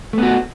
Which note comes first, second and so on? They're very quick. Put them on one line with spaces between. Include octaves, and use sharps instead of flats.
A3 B3 F#4